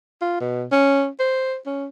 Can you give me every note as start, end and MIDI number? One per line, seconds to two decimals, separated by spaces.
0.22 0.40 65
0.40 0.64 47
0.72 1.08 61
1.20 1.57 72
1.66 1.88 61